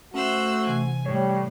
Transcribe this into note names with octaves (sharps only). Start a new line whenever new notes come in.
A3 C#4 F#4 C5 E6 F#6
C3 E3 G#5
A2 G3 C#5